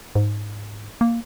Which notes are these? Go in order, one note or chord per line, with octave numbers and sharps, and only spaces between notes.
G#2
A#3